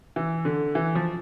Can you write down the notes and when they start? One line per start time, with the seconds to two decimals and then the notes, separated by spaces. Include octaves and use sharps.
0.16 E3
0.45 D3
0.75 E3
0.95 F3